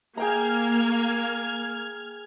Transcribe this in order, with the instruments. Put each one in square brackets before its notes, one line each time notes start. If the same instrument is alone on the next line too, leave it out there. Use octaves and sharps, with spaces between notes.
[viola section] A#3 [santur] G#4 G5 A#5 [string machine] F6 G#6